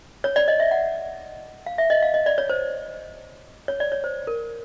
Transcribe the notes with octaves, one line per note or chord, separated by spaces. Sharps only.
C#5
D5
D#5
E5
F#5
F5
E5
D#5
F5
D#5
D5
C#5
C5
C#5
D5
C#5
C5
A#4